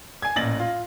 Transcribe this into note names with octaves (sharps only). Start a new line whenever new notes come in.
G#5 G#6
A1 A#2 A6 A#6 F#7
F4